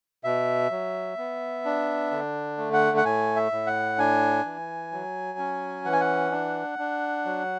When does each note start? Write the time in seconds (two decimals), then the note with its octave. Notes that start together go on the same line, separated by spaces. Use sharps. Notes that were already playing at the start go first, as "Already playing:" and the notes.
0.24 B2 E5
0.71 F#3
1.18 B3
1.65 D4
2.11 D3
2.58 A3
2.73 F#5
2.97 F#5
3.05 A2 G#5
3.36 E5
3.52 A2
3.67 F#5
3.99 D4 G#5
4.45 E3
4.92 F#3
5.39 C#4
5.85 E3 F#5
5.93 G#5
6.00 F#5
6.32 D4
6.79 D4
7.25 F#3